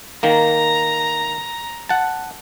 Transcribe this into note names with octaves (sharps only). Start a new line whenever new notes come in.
D#3 A#3 A#5
F#5 A5